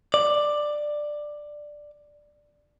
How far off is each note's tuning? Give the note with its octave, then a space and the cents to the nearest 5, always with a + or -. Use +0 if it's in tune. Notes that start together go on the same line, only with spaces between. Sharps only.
D5 +10